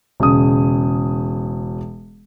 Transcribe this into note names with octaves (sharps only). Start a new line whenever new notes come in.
E1 C#3 D#6